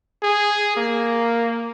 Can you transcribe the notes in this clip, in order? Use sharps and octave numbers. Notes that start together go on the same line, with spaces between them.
G#4
A#3